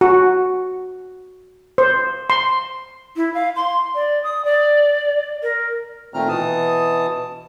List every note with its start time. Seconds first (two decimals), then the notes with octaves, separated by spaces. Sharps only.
0.01 F#4
1.78 C5
2.30 C6
3.16 E4
3.34 F5
3.56 C6
3.95 D5
4.24 D#6
4.45 D5
5.43 A#4
6.14 A#2 D#3 A3 C4 A#5 F6
6.29 B2 E3 A5 D#6